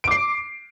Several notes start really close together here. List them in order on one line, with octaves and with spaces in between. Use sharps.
D7 D6 C7